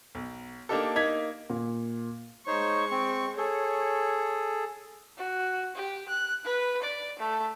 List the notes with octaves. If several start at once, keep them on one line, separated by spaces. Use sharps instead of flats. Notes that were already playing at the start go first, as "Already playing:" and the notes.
B1
A#3 D4 D#4 G4 A4
A#3 D#4 G#6 B6
A#2
G#3 D#4 C5 C#5 C#6
C4
G#4 A4 C#5
F#4
G4
F#6
B4
D5
A3